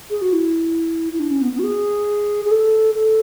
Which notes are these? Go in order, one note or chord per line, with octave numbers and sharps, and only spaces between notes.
G#4
F#4
E4
E4
D4
C#4
B3
B3
F#4
G#4
G#4
A4
A4